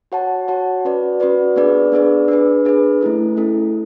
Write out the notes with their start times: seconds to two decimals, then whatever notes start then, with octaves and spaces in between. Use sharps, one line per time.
0.12 F#4 C#5 F#5 A5
0.48 F#4 C#5 F#5 A5
0.85 C#4 F#4 B4 D5
1.20 C#4 F#4 B4 D5
1.56 B3 D4 G#4 B4 D5
1.92 B3 D4 G#4 B4 D5
2.28 D4 G#4 B4
2.65 D4 G#4 B4
3.01 A3 C#4 E4 A4
3.37 A3 C#4 E4 A4